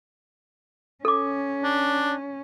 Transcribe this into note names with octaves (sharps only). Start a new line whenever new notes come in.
C#4 A4 D6
D4